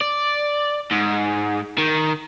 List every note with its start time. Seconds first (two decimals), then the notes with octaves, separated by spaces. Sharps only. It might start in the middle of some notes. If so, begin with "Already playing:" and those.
0.01 D5
0.92 G#2
1.78 D#3